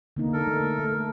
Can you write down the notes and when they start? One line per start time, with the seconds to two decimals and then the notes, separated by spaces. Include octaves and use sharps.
0.16 D3 A#3 D#4
0.33 A4 A#4
0.47 A3
0.79 A3